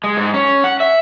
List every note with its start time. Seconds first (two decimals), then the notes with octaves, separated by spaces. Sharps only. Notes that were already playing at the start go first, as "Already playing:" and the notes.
0.04 G#3
0.17 G#2
0.34 C#4
0.64 F#5
0.80 E5